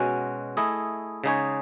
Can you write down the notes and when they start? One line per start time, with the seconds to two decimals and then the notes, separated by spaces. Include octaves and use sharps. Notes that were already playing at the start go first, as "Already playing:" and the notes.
Already playing: B2 G#3 C#4 F#4
0.57 A3 E4 G#4 D#5
1.24 C#3 G#3 D#4 G#4 C#5